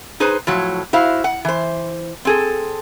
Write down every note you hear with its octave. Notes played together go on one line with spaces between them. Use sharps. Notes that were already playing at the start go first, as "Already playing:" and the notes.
D#4 G#4 B4 C5
A2 F3 F#3
E4 F#4 C5 F5
F#5
E3 C5
C4 G#4 A4